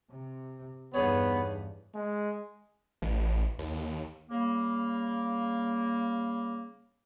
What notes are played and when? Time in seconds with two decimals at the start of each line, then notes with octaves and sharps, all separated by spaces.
0.10 C3
0.94 E2 G2 B3 D#4 G#4 C#5
1.95 G#3
3.02 A1
3.59 D#2
4.30 C#3 G3 A#3